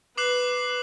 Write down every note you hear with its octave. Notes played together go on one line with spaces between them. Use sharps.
B4 D6 F#6 C7 F#7